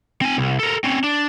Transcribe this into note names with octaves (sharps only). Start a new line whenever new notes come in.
C4 G#5
C2
A4 A#4
C4 C#4
D4